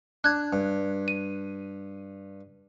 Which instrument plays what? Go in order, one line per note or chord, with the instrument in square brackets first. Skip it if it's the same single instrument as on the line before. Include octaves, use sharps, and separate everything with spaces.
[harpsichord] D4 [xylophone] F#6 G#6
[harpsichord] G2
[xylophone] D#7